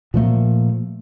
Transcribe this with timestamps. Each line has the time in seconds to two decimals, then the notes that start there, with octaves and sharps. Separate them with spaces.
0.14 A#2 F3 A3 A#3